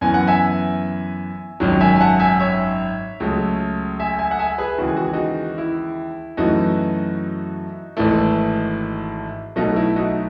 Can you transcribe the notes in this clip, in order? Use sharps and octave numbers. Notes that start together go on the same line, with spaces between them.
F#2 E3 B3 G#5
F#5
E5 G#5
G#1 F#2 D#3 F#3
E5 G#5
G#5
F#5 A5
E5 G#5
C#5 E5
C#2 C#3 F#3 A3
E5 G#5
E5 G#5
F#5
E5 G#5
G#4 B4
D#2 C#3 E3 G#3 F#4
G#4
F#4
G#4
D#4 F#4
E4
F#2 E3 A3 D#4 F#4
G#1 G#2 E3 A3
B1 B2 A3 D#4 F#4
E4
D#4 F#4